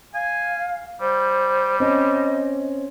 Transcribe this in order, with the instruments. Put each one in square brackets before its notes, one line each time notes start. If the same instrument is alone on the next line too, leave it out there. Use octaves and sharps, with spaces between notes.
[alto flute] F5 [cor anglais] G#5
[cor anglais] G3 [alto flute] C5
[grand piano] C4 C#4 [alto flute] D#5